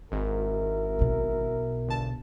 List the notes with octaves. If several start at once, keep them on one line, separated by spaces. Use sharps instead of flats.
G#1 E4 F#4 A#4
B1 B2
G1 A5